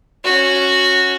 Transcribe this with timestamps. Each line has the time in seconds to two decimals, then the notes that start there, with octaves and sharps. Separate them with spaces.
0.24 C#4 F#4